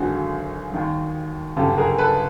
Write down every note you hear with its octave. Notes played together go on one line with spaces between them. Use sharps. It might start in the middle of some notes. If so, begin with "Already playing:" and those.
Already playing: G#1 F#2 D3 F#4 G#4
D#2 D#3 G3
G1 F#2 C#3 G4 A4
G#4 A#4
A4 B4